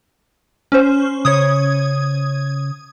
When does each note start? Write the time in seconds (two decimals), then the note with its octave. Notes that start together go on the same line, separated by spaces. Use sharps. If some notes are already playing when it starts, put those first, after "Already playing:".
0.72 C#4 C5
1.25 C#3 C#5 D#6 G#6